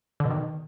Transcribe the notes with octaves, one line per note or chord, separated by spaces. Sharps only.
D3
B2
D#3